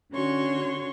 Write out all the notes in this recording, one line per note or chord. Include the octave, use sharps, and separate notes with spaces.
D3 C#4 F#4 C#5 C6 C#6